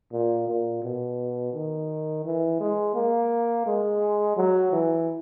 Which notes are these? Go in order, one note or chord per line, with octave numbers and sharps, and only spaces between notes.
A#2
A#2
B2
D#3
E3
G#3
A#3
G#3
F#3
E3